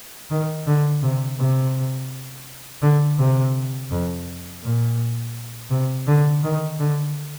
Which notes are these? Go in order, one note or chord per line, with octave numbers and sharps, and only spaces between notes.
D#3
D3
C3
C3
D3
C3
F2
A#2
C3
D3
D#3
D3